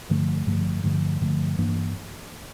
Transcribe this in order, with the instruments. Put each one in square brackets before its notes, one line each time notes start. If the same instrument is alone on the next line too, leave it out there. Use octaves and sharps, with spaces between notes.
[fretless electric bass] G2 D3 F3 A3
G2 D3 F3 A3
G2 D3 F3 A3
G2 D3 F3 A3
G2 E3 A#3 D4